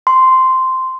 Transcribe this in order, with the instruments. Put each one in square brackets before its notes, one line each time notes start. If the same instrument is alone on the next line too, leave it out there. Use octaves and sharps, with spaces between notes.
[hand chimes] C6